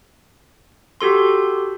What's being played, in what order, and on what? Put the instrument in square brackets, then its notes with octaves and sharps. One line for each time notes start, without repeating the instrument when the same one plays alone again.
[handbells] F#4 G4 A4 C6